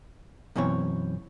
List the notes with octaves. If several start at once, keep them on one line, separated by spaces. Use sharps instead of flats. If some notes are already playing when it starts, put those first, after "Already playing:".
F#2 B2 E3 C4 C#5